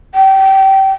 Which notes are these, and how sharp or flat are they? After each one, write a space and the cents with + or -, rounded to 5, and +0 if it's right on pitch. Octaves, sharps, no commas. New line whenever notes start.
G5 -25